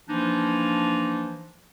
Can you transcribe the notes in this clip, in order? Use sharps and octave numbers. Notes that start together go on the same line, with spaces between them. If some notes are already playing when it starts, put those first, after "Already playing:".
E3 F3 A#3 D4 D#4